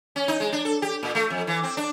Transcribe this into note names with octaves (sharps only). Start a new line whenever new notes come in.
C#4
D#4
G#3
D4
A4
G4
A#2
A3
F2
E3
C4
D4